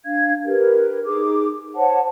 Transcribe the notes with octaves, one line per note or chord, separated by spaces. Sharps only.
D4 F5 G#6
G4 A#4 B4
D#4 G#4 D6
C5 C#5 F#5 A5